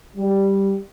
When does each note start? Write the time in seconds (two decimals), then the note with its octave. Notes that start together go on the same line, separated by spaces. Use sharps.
0.16 G3